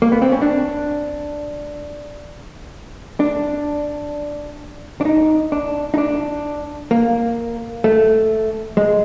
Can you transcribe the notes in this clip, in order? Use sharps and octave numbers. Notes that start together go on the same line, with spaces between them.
A#3
B3
C4
C#4
D4
D4
D4
D#4
D4
D#4
D4
A#3
A3
G#3